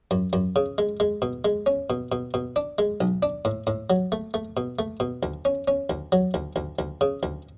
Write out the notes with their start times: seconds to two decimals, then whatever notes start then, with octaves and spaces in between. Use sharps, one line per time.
0.11 F#2
0.33 F#2
0.56 C#3
0.78 G#3
1.00 G#3
1.22 B2
1.45 G#3
1.66 C#4
1.90 B2
2.12 B2
2.34 B2
2.56 D4
2.78 G#3
3.01 B1
3.23 D4
3.45 A2
3.67 A2
3.90 F#3
4.12 A3
4.34 A3
4.57 B2
4.79 A3
5.00 B2
5.23 D2
5.45 C#4
5.68 C#4
5.90 D2
6.12 F#3
6.34 D2
6.56 D2
6.79 D2
7.01 C#3
7.23 D2